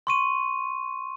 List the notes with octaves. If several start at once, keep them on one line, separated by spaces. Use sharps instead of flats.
C6 C#6 D#7